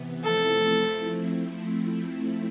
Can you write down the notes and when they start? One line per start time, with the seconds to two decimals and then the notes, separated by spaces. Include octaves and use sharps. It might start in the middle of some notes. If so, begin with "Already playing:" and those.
Already playing: C3 E3 B3
0.24 F3 A3 C4 E4 A4